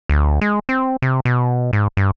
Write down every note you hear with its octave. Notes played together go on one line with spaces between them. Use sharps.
D2
G#3
C4
C3
B2
G#2
G2